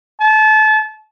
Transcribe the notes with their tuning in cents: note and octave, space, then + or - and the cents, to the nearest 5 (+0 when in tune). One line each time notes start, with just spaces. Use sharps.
A5 -30